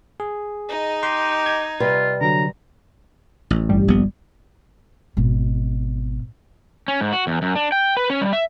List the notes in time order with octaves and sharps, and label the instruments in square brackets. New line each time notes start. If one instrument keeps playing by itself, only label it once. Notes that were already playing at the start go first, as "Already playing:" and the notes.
[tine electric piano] G#4
[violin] D#4 D#5
[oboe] G4 [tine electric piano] C6
[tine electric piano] G#6
[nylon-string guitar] C3 G3 B4 [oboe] F4
[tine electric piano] D3 F#3 [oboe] A#5
[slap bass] A1
[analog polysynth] G1 G3
[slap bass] A#1 B3
[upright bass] G#1 B2
[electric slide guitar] C#4
G#2
F#4
E2
F#2
D4
G5
B4
C#4
G3
E5